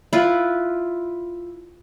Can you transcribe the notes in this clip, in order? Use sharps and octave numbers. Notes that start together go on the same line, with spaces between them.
E4 F4 B4